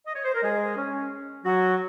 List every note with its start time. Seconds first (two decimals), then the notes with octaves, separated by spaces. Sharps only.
0.06 D#5
0.15 C#5
0.25 C5
0.34 A#4
0.43 G#3 G#4
0.76 C#4
1.44 F#3 F#4